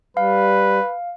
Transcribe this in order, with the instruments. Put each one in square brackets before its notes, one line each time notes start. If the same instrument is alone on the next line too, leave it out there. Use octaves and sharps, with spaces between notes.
[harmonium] G3 [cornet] B4 [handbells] F5